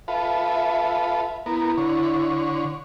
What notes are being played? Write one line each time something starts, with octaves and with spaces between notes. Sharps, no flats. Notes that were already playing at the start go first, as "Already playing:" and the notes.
F4 A4 B4 E5
B3 E4 A#4
D3 C#5